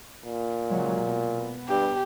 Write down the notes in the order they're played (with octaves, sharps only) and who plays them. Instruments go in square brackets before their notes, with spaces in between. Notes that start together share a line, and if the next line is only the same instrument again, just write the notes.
[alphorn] A#2
[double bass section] C#3 F#3 G#3
B2
B3
[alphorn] G2 [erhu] G4